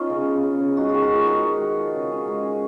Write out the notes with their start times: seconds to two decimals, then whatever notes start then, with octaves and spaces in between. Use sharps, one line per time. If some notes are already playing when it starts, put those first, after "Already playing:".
Already playing: F3 B3 C#4 D#4 F4
0.10 C#3
0.26 C#3
0.43 C#3
0.60 C#3
0.77 G#3 D#4 F#4
0.89 F4 G#4
0.94 D#3
1.02 F#4 A#4
1.10 G#3
1.15 F4 G#4
1.27 D#3 D#4 F#4
1.44 G#3
1.61 D#3
1.77 F3
1.94 C#3
2.11 C#4
2.28 G#3
2.45 C#4